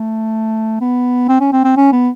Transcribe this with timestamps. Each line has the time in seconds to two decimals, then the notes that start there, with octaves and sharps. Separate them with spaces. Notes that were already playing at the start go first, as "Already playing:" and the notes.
Already playing: A3
0.81 B3
1.29 C4
1.40 C#4
1.52 C4
1.64 C4
1.77 C#4
1.92 B3